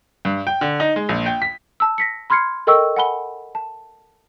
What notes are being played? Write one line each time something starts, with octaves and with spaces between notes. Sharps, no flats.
G2
G5
D3
D#4
G#3
A#1
G5
B6
A5 E6
A#6 B6 C#7
B5 C6 F6 G#6 C7 C#7
A4 A#4 D#5 G5 C#6 E6
F#5 G#5 B5 G7
A5